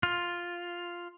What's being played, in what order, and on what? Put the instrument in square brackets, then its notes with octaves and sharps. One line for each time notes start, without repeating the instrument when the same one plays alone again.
[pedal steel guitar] F4